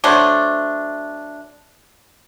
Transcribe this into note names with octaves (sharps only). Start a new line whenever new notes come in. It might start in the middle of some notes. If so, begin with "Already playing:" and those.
F#3 A3 D4 C5